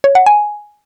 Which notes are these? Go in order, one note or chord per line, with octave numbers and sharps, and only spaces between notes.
C#5
F#5
G#5